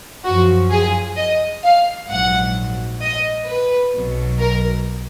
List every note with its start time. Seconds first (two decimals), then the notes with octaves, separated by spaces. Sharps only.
0.25 F#2 F3 F#4
0.71 G#4
1.17 D#5
1.63 F5
2.09 A#1 G#2 F#3 F#5
3.02 D#5
3.47 B4
3.93 B1 B2 F#3
4.39 A#4